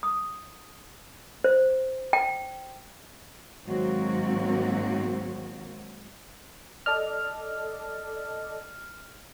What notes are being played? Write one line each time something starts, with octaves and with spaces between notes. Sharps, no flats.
D#6
C5
G5
G#2 D#3 F#3 A#3 C4 F#4
A4 D5 D#5 F6